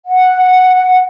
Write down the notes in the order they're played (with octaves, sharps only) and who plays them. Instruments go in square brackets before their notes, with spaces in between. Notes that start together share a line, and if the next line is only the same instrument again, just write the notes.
[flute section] F#5